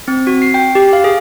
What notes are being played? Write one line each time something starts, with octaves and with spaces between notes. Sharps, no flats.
C4
F#4
C7
G5
G4
F5
G#4